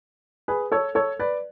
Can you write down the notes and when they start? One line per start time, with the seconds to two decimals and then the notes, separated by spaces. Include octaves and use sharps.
0.48 G#4 B4
0.72 A4 C#5
0.95 A4 C#5
1.19 B4 D5